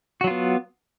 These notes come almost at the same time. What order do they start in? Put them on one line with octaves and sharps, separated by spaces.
F#4 F#3 F4 B3